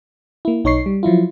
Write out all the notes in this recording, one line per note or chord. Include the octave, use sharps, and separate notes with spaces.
A#3 E4
B1 D#4 C#5 C#6 C7
G3
F3 F#3 E4 F4